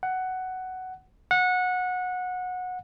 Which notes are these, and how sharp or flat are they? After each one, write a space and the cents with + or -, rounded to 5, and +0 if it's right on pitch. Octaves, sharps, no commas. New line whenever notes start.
F#5 +10
F#5 -20